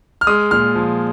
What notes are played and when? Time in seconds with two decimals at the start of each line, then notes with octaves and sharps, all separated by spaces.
0.21 F6
0.27 G#3 D#6
0.51 A#2 F6
0.75 F3